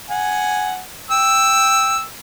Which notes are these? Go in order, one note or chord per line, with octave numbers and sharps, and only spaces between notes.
F#5 G#5
G5 E6